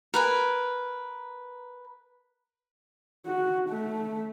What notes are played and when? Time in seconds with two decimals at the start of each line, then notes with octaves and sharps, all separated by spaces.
0.14 A#4 B4 G#5
3.26 F#4
3.69 A3